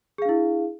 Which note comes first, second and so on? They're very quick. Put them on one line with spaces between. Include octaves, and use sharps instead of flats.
G#4 F5 D4 E4